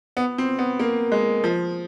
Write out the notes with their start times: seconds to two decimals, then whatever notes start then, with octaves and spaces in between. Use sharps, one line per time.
0.17 B3
0.38 C4
0.59 B3
0.80 A#3
1.12 G#3
1.44 F3